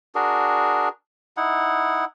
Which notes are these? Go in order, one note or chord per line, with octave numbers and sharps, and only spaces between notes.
D4 F#4 G#4 A#4
D#4 E4 F#5